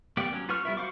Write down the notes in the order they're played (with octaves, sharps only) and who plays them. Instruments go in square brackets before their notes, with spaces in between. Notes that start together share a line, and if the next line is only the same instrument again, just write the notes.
[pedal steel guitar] A#3 B3 G4 D5
F#3 C#4
F4 F#4 B4 C#6 F6
G3 B3 E4 A#4 E5
F#4 C5 F5 C#6 D6